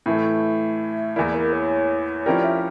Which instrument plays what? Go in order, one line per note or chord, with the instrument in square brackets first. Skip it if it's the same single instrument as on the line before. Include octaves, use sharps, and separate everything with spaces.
[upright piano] A2 E3 A3 [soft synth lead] E5
[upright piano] E2 E3 A#3 E4 [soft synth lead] D5
[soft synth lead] A#4
C#5
[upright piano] F3 C#4 E4 G4 A#4 [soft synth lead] D5
[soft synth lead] E5